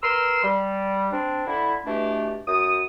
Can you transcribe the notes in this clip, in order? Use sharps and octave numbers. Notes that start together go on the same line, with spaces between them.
A#4 B4 C6 E6
G3
C4 D4
D3 A3 E4
B2 E3 A3 D4 G4
F#2 D#6